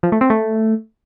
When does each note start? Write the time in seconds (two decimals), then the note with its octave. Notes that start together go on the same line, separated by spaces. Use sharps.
0.03 F3
0.12 A3
0.21 C4
0.30 A3